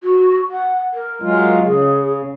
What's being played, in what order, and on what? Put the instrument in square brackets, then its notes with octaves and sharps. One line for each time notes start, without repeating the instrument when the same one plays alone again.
[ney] F#4
F#5
A#4
[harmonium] F#3 G#3 F4
[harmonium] C#3 [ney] G#4